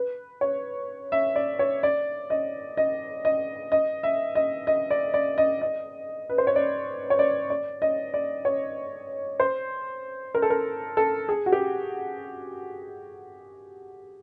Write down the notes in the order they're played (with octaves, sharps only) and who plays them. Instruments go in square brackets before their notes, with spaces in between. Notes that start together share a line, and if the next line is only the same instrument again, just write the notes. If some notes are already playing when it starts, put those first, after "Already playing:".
Already playing: [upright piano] B4
C#5
E5
D5
C#5
D5
D#5
D#5
D#5
D#5
E5
D#5
D#5
D5
D5
D#5
D#5
B4
C5
C#5
D5
C#5
D5
D5
D#5
D5
C#5
C5
A#4
A4
A#4
A4
G#4
F#4
G4